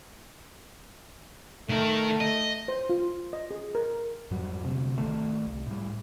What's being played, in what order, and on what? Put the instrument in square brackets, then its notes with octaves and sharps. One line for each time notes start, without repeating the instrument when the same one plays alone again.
[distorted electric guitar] D#3 A#4 [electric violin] A3
[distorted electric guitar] D#5
[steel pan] C5
F4
D#5
G#4
A#4
[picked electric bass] F2 G#2 F#3 G3
D2 C3
G#1 E2 D#3 A3
C2
A2 G3